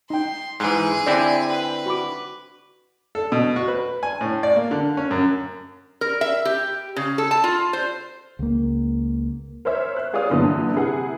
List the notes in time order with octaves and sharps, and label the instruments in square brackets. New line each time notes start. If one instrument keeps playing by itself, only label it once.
[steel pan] D#4 G5 [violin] C6
[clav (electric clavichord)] G#2 E3 [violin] G#4
[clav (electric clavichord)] D3 C4 E4 [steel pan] D5 G#5
[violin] B4 [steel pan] G5
[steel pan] F#4 B5 D6
[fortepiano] A4
B2
F#4
B4
G#5
A2
D5
A#3
D3
C#4
F#2
[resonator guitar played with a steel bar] A#4
E5
G4
C#3
A4
A5
F4
C5
[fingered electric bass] C#2 A#3
[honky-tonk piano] A#4 C5 C#5 E5
F#6
F4 G#4 C#5 D5 F5 D#6
F#2 A#2 D3 E3
C3 E4 G#4 F#5